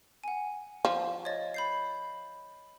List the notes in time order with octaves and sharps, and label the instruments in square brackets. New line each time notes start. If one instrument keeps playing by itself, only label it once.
[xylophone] F#5 G#5
[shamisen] F3
[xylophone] C#5 D#5 A6
B5 G6 C7